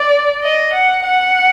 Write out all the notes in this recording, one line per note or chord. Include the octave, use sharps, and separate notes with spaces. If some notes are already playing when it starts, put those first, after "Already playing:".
Already playing: D5
D#5
F#5
F#5